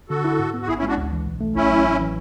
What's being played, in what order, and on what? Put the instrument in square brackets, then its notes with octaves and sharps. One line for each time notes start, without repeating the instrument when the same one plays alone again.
[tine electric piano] D3 [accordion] F#4 A4
[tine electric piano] E4
G#2
B3
[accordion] F#4
[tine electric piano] A1 [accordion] E4 G#4
[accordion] C#4 E4
[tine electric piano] G#3 [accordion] D4 F#4
[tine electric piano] D2
E3
B1
A3
[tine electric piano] A1 [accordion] C#4 E4
[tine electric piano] F#3
A1
E3